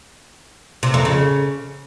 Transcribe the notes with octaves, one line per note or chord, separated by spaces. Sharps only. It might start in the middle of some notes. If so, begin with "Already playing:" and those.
C3
F2
C#3